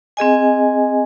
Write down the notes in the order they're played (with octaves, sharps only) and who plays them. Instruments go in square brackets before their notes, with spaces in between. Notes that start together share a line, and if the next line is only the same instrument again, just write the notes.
[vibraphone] C4 G#4 D#5 G#5